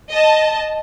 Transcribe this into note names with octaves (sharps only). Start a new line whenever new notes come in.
D#5 A5